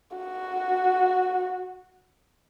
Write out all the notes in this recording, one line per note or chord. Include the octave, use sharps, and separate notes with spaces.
F#4